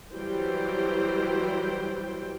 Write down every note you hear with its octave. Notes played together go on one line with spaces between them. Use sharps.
E3 F#3 G3 C5 G5